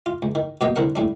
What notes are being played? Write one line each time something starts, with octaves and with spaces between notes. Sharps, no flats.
F4
C#2
D#3
B2 F#3 A#3 G4 D#5 G5
C2 D3 C4 A#4 F#5
A2 G3 D4